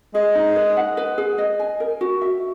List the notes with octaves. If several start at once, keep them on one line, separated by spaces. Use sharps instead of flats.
G#3 G#4
D#4
B4
F#5
B4
G#4
D#5
G#5
A#4
F#4
E5